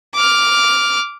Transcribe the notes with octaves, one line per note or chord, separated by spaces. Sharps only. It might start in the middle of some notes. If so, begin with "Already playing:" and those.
D6 F6